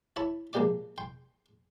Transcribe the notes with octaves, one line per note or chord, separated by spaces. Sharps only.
E4 C#5 A5 B5
A#1 G#3 A#3 G4 D5 D6
G5 C6